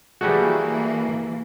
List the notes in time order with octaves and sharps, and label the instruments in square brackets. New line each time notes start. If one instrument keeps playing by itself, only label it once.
[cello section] E3 A#3 [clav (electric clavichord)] G3 A3 F#4 [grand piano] G#4